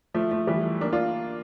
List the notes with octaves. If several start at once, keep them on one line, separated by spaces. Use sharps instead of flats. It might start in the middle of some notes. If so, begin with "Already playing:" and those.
F3 A3
F3 A3
E3 G3
A#3 D4
D4 F4